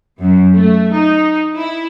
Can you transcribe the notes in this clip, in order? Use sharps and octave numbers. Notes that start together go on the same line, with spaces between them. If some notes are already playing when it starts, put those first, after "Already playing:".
F#2
A3
D#4
E4